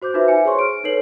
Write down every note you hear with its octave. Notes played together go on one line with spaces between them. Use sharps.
F#4 C5 D6 G6
D#4 F4 F#4 B4 C5 E5
B4 E5 G#5 C#7
G#4 C5 C#5 C6 C#6
F6 D7
D#4 A4 B4 C#5 C7 F#7